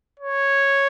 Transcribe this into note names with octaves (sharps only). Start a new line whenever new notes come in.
C#5